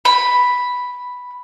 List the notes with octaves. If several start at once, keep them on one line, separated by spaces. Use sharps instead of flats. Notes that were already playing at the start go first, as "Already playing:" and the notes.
B5